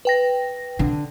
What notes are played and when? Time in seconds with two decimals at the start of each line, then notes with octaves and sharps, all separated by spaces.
0.05 B4 G5 A#6
0.79 D3